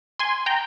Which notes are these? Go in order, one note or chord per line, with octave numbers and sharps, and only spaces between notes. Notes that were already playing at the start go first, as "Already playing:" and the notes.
G#5 C6
G5 A#5